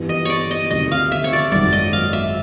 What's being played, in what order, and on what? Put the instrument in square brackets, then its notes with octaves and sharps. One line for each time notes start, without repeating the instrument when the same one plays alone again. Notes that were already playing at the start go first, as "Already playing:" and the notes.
Already playing: [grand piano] G2 E3 G3 B3
[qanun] D#5
C#5 D5
D#5
[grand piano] D2 C3 D#3 [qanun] D#5
[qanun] F5
E5
C#5
D5
[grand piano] G#1 F#2 D#3 F#3 [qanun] D5
[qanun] D#5
F5
E5